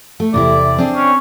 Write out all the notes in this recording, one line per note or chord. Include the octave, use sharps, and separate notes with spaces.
A3
E2 C3 E4 D5
C4 D4 G#4
C#4